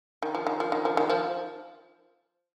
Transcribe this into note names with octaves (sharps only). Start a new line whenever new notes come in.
D#3
F3
D#3
F3
D#3
F3
D#3
F3